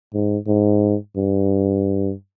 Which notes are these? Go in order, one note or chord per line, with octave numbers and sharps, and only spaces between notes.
G#2
G#2
G2